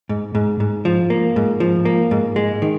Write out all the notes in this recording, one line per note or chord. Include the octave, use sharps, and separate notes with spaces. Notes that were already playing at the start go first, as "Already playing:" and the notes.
G#2
G#2
G#2
F3
A#3
G#2
F3
A#3
G#2
G#3
D#3